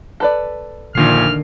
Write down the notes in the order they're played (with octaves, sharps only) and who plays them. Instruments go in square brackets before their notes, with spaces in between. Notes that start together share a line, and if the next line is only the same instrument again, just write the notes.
[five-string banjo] A4 B4 D5
[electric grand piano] A#1 A#2 C7 [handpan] D3 D#3 D4 [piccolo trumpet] F6